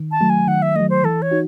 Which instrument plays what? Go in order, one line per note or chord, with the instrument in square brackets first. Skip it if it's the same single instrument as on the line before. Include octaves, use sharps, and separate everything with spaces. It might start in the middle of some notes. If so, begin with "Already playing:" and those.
Already playing: [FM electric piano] D#3
[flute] A5
[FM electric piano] F#3 A3
[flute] G#5
[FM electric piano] D#3 [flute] F#5
[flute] E5
[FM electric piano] F#3 A3 [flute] D#5
[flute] C5
[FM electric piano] E3 [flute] A4
[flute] C#5
[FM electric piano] D#4 F#4